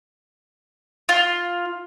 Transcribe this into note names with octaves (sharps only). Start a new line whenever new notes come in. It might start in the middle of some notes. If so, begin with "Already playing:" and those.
F4